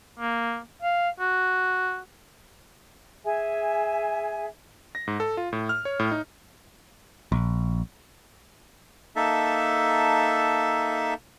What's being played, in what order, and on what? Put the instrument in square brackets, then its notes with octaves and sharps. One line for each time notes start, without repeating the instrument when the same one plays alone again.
[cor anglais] A#3
F5
F#4
[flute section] G#4 E5 G#5
[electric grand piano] A#6
G#2
A4
F4
A2
F6
C#5
A2
D#4
[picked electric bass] A#1
[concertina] A#3 D#4 A4 E5 A5